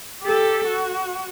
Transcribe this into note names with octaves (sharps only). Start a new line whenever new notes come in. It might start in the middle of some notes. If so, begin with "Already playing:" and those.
G4 A4
F#4